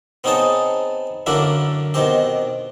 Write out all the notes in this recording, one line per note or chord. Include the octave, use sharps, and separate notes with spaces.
B3 C4 D#4 G#4 C#5 A5
F#2 D3 F#3 A#3 D4 E4
B2 D#3 C4 G4